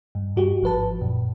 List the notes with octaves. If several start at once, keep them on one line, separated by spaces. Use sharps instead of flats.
G2
G2 F#4 G4
G#1 F3 B4 A5
F#2 A#2